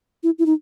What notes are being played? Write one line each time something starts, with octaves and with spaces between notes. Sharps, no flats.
E4
E4
D#4